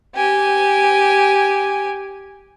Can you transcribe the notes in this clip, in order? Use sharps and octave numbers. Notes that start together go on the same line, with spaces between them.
G4 G#5